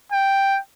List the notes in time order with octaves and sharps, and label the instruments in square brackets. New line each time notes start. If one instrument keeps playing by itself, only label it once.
[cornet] G5